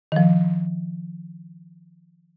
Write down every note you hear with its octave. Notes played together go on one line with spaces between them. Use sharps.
D#3 F3